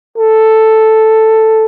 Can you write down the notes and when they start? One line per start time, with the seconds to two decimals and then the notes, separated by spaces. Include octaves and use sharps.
0.18 A4